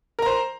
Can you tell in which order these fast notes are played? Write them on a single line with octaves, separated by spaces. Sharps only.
A#4 A#5 C5